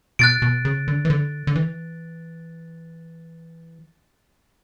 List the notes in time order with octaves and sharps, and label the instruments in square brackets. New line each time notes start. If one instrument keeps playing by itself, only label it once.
[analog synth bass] B2 [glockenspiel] F#6 A6 D7
[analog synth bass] B2
C#3
D3
E3
D3
D3
E3